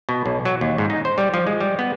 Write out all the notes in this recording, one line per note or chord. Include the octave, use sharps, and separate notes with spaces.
B2
B1
F#3
D#2
G#2
D#4
C5
G3
F3
G#3
G3
B3